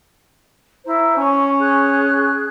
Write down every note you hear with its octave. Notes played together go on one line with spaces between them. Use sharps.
E4 C5 A#5
C#4 G#5 C#6
G#4 F6 F#6